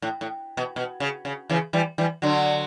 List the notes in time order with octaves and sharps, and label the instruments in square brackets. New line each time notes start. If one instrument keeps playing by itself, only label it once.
[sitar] A2
A2
B2
B2
C#3
C#3
C#3 E3
E3 G3
E3 G3
D3 F#3